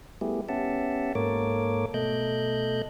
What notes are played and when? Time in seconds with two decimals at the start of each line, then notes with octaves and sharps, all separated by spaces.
0.21 G3 A3 B3 E4 G4 G#4
0.49 B3 C#4 G4 E5 F#5 A5
1.15 G#2 A#3 A4 A#4 C#5 D6
1.94 B2 A3 A4 D#5 F#6 G6